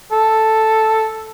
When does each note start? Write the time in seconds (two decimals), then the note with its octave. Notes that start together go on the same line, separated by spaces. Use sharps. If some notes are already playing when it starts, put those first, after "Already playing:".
0.12 A4